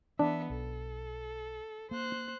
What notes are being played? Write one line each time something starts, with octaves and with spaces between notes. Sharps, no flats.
E3 B3 D4 E5
B1 A4
A#3 C5 F#6